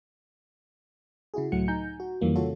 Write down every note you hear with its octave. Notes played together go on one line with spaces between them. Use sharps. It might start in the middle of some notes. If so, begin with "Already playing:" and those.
C#3 E4 F#4 G#4
C#2 A2 F#3 A3 F#5 C#7
D#4 G#5 A#5 G6
F#4
F2 D#3 E3 G3 A#3 C#4
C#3 C#4 F4 F#4 A4 C#5